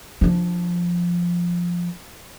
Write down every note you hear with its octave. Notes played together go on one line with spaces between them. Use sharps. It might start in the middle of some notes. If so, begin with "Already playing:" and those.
F3 D4